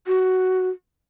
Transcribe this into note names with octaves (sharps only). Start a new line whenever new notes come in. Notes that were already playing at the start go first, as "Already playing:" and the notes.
F#4